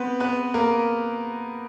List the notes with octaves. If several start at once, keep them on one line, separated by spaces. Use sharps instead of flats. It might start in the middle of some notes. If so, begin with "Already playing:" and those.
Already playing: B3 C4 B4
B3 B4
A#3 A#4